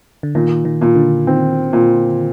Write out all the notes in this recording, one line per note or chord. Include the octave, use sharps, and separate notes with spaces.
D3
A#2 D#3
D#3
A#2
D3
D#3 C4
A#2